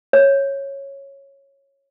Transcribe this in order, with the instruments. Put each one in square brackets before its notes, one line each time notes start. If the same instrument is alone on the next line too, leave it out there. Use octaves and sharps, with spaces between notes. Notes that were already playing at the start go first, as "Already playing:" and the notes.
[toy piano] C#5